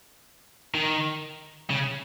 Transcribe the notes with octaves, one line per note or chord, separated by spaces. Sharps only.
D#3
C#3